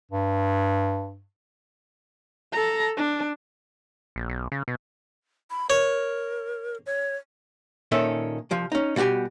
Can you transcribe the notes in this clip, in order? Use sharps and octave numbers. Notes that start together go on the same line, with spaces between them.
G2
A4 A#5
D4
A#1
B1
C#3
B2
B5
A#4 C#5
C#5
A#2 D#3 C#4 A4 E5
C2 F3
C#4 D#4
B2 G3 F#4 G4 G#5